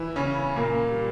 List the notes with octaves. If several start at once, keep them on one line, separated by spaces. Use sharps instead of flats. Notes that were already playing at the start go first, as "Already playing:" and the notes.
Already playing: E3 E4
C#3 C#4
A#2 A#3
G3